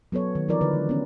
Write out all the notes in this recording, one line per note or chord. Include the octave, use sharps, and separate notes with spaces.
F#3 B3 A4 C#5
D#3
E3 F3 D#4 A#4 D5
D3 B4
G#3
B3 C#4